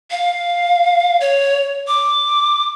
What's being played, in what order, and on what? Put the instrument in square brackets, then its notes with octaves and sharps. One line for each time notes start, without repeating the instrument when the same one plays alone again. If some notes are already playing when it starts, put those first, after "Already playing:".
[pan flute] F5
C#5
D6